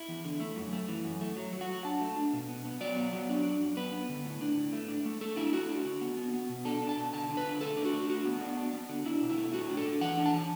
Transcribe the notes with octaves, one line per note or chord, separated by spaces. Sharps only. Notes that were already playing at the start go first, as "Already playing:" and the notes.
Already playing: E4
E2
D3
A3
F#2
A3
E3
F#2
A3
F#3
F#3
F#4
F#3
D4 A5
A3
D4
B2
B3
B3
F#3 D5
B3
F#3
D4
D4
F#2
B3 B4
B3
D3
A2
D4
A2
A3
D4
A3
A3 A4
D4 E4
A3 F#4
D4
D3
B3
B3
B3
B2
D4 A4
D4
A5
B2
D3 A5
D3
B4
D3
A3 A4
D4
F#4
A3
D4 F#4
B3
D4
D4
B3
D3
D4 E4
B2
E4
A3
A2 F#4
D4
A4
D4
E3 F#5
D4
A5
E3